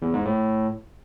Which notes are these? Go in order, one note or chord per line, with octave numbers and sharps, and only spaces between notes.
E2
G#2
A2